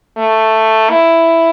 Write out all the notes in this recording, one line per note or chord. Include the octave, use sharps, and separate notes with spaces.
A3
E4